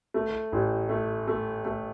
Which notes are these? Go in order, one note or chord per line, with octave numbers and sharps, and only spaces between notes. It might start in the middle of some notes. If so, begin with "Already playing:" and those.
A3
A1
A3
A3
A3